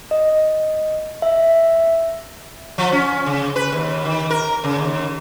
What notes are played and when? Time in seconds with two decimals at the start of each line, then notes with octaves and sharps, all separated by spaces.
0.11 D#5
1.22 E5
2.78 F3
2.92 C#4
3.26 C#3
3.56 B4
3.72 D#2
4.05 D#3
4.30 A#4
4.64 C#3
4.79 D#2